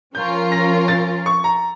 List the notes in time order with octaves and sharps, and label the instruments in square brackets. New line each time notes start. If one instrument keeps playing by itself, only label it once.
[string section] F3 C#4 F4 A#4 [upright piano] G6
[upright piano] A#6
A6
C#6
A#5